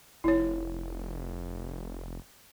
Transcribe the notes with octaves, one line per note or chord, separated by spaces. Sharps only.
F1 E4 C#5